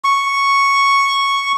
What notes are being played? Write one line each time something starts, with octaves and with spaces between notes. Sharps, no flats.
C#6